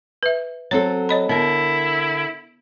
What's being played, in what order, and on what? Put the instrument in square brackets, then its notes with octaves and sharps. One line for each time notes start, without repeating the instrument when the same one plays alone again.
[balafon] B4 E5
[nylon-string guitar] F#3 C4 A4 [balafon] C#5
[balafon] C#5 D#5 B5
[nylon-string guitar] D3 A#4 [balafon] B3 [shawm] E4